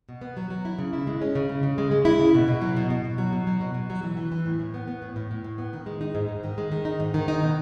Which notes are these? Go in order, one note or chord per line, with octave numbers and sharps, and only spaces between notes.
B2
B3
F#3
F#3
E4
C#3
E4
G#3
C#4
C#3
G#3
C#3
G#3
G#3
E4
C#3
B2
B2
F#3
B2
B2
B2
F#3
B2
F#3
B2
B2
F#3
E3
E3
E3
A2
A2
B3
B3
A2
A2
A2
A2
B3
D#3
G#3
D#4
G#2
G#2
D#3
G#3
D#3
D#4
G#2
D#3
D#4
B2